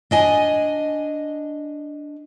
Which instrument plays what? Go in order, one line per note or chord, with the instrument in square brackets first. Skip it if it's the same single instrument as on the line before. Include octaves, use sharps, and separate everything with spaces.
[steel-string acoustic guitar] D4 D#5 G#5